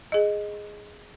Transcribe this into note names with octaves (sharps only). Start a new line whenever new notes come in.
G#4 D#5